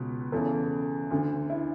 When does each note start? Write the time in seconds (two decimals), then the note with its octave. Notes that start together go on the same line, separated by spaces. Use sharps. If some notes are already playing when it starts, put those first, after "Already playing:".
Already playing: C#2 B2
0.32 E2 C#3 E3 A4
1.10 D2 D3
1.50 E4